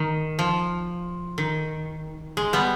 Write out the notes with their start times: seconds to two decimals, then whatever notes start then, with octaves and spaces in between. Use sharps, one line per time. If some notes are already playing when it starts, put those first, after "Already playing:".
Already playing: D#3
0.39 F3
1.38 D#3
2.37 G#3
2.53 G3 B3